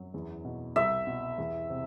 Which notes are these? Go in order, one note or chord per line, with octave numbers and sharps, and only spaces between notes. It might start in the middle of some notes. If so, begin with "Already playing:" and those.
Already playing: F#2 F#3
E2
B2
C2 E5
B2
E2
C3